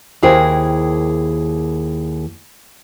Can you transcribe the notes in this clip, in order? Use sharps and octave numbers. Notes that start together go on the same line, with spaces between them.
D#2 E4 G#4 A#4 C5 G5